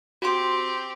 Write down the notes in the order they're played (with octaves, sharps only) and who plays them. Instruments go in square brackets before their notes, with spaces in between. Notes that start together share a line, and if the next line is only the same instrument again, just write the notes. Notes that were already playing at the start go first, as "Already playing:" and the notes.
[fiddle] C4 G4 [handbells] F#4 C6